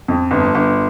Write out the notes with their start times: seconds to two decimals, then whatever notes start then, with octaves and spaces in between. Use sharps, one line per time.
0.08 F2
0.31 G1
0.55 G1